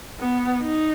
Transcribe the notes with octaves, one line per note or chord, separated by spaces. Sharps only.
B3
D#4